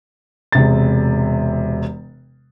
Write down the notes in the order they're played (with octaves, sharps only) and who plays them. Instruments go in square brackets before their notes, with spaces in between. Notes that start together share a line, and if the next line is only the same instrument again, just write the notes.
[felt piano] E1 C3 A6